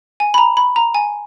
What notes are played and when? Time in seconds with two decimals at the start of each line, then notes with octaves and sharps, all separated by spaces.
0.20 G#5
0.34 B5
0.38 A#5
0.57 B5
0.76 A#5
0.94 G#5